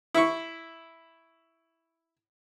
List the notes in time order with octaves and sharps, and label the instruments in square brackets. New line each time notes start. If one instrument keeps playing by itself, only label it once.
[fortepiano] E4 C#6